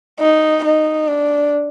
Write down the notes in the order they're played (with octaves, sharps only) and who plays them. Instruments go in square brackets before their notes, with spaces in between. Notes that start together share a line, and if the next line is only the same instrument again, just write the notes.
[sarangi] D#4
D#4
D4